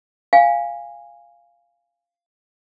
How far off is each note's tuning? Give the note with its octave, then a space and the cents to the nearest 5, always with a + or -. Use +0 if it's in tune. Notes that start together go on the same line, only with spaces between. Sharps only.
F5 -5 G#5 -15